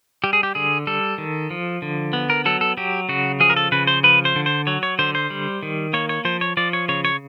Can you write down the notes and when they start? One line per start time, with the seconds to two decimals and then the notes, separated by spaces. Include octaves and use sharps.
0.24 G3 G4
0.33 G#4
0.43 G4
0.55 D3 G#4
0.87 G3 A4
1.18 D#3
1.51 F3
1.82 D3
2.13 B3
2.30 A#4
2.46 F#3 A4
2.61 A4
2.77 F#3 G4
3.09 C#3 F#4
3.40 F3 G#4
3.50 A#4
3.56 A4
3.72 C#3 B4
3.87 C5
4.03 F3 B4
4.25 C5
4.36 D3
4.46 C5
4.67 F#3 C#5
4.83 C#5
4.99 D3 C5
5.15 C5
5.30 G3
5.63 D#3
5.93 A#3 C#5
6.09 C#5
6.25 F3 C5
6.41 C#5
6.57 F3 D5
6.73 C#5
6.89 C#3 C#5
7.05 C#5